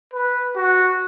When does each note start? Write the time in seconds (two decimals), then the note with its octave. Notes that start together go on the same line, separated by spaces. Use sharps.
0.13 B4
0.56 F#4